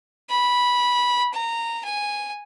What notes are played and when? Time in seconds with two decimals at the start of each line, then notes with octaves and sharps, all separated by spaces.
0.29 B5
1.33 A#5
1.84 G#5